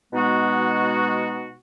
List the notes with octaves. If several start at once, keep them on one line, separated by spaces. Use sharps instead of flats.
B2 G#3 B3 D#4 F#4